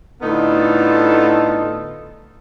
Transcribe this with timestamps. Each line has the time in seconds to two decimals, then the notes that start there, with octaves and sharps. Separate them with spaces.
0.22 A2 D3 B3 D#4 F4 A4